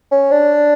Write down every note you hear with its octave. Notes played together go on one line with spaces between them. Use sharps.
C#4
D4